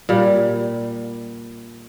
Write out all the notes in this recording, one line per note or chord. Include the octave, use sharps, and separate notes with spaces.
A#2 G3